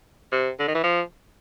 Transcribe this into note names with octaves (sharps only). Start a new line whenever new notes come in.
C3
D3
D#3
E3
F3